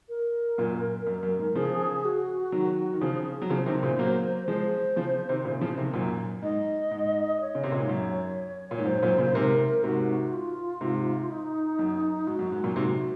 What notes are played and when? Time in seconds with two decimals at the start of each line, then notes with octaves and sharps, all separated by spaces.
0.09 A#4
0.58 F#2 A#2
1.07 F#2
1.23 F#2
1.39 G#2
1.55 C#3 F3 G#4
2.05 F#4
2.52 D#3 F#3
2.93 D#3
3.01 C#3 F3 G#4
3.42 F#3
3.50 C#3 F3 C5
3.66 C3 D#3
3.83 A#2 C#3
3.99 F#3 A#3
4.48 F3 G#3 C5
4.96 C#3 F3
5.29 C3 D#3
5.45 A#2 C#3
5.61 C#3 F3
5.77 C3 D#3
5.94 F#2 A#2
6.42 G#2 D#5
6.91 G#2
7.41 C#5
7.55 C#3
7.63 C3
7.72 A#2
7.80 G#2
7.89 F#2
8.71 A#2
8.78 G#2 C#5
8.86 F#2 C5
9.02 F#2 A#2
9.18 A#2 C#3
9.34 G#2 C3 A#4
9.84 G#2 C3 F#4
10.33 F4
10.81 G#2 C3
11.30 D#4
11.79 F#2
12.27 G#2 F#4
12.39 F#2
12.52 G#2
12.64 F#2 A#2
12.76 G#2 C3 F#4